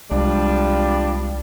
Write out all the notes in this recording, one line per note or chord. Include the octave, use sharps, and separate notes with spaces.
C2 F3 G3 G#3 D4